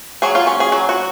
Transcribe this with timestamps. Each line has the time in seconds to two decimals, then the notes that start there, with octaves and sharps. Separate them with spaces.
0.22 F#3 G#4
0.35 F4
0.47 C#4
0.60 G#4
0.72 F#3
0.89 F#4